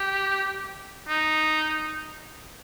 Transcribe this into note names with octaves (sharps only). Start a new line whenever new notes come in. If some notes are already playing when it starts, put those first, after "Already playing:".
Already playing: G4
D#4